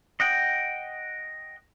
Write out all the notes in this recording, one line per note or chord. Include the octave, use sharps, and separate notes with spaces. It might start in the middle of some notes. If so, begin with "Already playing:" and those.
D#5 F#5 G5